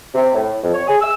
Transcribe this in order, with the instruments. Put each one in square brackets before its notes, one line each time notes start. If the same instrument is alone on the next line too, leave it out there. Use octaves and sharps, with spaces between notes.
[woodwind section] C3
A2
F2
C#5
G#4
E6